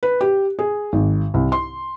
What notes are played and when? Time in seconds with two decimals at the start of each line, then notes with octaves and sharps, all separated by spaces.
0.03 B4
0.21 G4
0.59 G#4
0.93 G#1
1.34 C2
1.52 C6